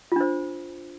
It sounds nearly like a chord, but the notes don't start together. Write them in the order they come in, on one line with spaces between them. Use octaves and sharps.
F4 D4 C5